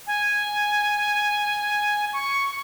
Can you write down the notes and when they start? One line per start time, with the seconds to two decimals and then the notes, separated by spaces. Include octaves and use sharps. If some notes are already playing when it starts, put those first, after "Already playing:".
0.07 G#5
2.13 C#6